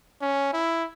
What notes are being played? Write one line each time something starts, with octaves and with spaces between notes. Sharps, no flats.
C#4
E4